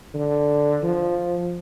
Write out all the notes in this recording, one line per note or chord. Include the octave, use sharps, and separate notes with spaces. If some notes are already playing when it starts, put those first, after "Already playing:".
D3
F3